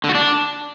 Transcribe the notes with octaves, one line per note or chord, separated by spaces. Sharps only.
D3
F#4
D4